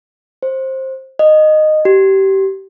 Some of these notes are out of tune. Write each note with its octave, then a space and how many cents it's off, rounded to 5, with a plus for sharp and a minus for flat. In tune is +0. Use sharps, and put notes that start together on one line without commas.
C5 +15
D#5 -10
G4 -25